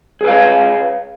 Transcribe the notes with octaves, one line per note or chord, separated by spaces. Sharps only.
G#4 B4 C#5 F5